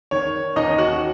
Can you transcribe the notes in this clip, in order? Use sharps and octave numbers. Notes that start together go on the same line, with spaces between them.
D#3 C#5
D#2 D#4 D#5
F#4 F#5